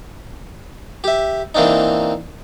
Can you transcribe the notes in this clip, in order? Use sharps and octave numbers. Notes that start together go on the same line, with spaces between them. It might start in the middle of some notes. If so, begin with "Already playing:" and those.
G4 E5
E3 A#3 C4 D4 D#4